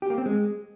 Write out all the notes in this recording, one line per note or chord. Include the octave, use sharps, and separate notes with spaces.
G4
A#3
C4
G#3